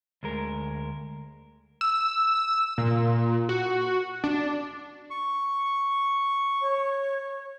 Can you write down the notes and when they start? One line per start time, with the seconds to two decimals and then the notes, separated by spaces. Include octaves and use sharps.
0.23 D2 G#3 A#4
1.81 E6
2.78 A#2
3.49 F#4
4.24 D4
5.10 C#6
6.61 C#5